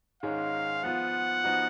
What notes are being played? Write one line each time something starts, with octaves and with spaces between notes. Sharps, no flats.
G#2 D#3 G#3 C#4 F5
F3 B3 F4 F#5
F3 B3 D#4 F#4